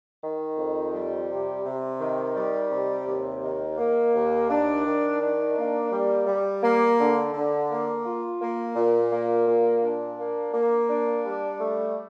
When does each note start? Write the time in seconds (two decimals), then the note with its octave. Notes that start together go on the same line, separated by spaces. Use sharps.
0.23 D#3
0.58 F2
0.93 G3
1.30 C3
1.65 C3
2.00 D#3
2.36 G3
2.71 C3
3.07 D#2
3.42 D#3
3.78 A#3
4.13 D#2
4.50 D4
4.86 D#3
5.21 D4
5.57 A#3
5.91 G3
6.27 G3
6.63 A#3
6.99 D3
7.34 D3
7.70 A#3
8.06 F4
8.41 A#3
8.76 A#2
9.12 A#3
9.47 A#2
9.83 D4
10.19 A#3
10.54 A#3
10.89 D4
11.25 G3
11.60 A3